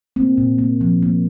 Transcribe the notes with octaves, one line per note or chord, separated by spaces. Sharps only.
A#3 C4
A#2
A#3
F3
A#3